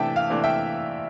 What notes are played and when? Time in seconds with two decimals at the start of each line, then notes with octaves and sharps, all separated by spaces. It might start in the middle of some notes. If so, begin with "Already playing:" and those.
Already playing: C3 E3 A3 D4 E5 G5 A5
0.16 F5
0.30 C3 E3 A3 D4
0.44 E5 G5